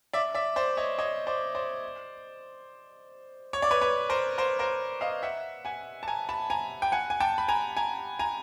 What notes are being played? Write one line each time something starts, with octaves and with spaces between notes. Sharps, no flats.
D5 E5
D5 E5
C5 D5
C#5 D#5
C#5 D#5
C5 D5
C5 D5
C#5
D5
B4 C#5
B4 C#5
A#4 C5
A#4 C5
A#4 C5
D#5 F5
E5 F#5
F#5 G#5
A5
G#5 A#5
A5 B5
G#5 A#5
G5
F#5 G#5
G#5
G5 A5
B5
G#5 A#5
G#5 A#5
G#5 A#5